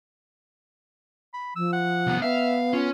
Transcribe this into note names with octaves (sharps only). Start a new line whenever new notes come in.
B5
F3 E6
F#5
C2 B3
B3 E5 F5
C#4 F4